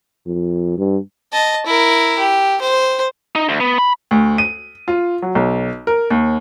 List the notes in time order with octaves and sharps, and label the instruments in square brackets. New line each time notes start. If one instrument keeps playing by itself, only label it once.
[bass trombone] F2
G2
[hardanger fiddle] D#5 A5
E4 A#4
G4
C5
[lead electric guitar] D#4
D2
B3
B5
[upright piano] D2
D#7
F4
F#3
B1
A#4
D#2